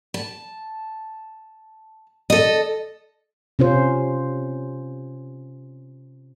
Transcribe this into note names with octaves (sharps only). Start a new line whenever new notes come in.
A5
A4 D#5
C3 C#4 F4 C5